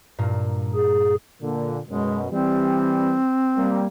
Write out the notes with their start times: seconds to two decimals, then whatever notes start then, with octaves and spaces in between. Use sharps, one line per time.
0.18 G2 A#2 A#3
0.75 G#4
1.42 A#2 D3
1.89 F#2 B2 G#3
2.31 E3 G3 C4
3.56 G3 A#3